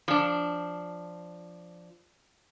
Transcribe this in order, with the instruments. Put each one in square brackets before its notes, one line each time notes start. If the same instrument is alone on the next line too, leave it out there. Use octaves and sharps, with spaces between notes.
[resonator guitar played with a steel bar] F3 D4